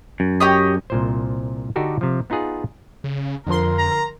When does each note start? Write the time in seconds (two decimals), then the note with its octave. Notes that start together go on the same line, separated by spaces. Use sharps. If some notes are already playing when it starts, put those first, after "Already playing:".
0.20 F#2
0.40 G4 C#5 D#5
0.90 C2 A#2 C5
1.76 D3 D4 D#4 F#4 G4 A4
2.01 C3 F3
2.30 B3 D#4 F4 G#4 F#5
3.04 C#3
3.46 F2 D3 F3 A#4 C6
3.78 A#5